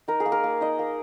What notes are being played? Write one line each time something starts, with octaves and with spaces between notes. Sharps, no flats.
D#4 A#4
G#4
A#3
A#4
A#3
D#4 D#5
A#3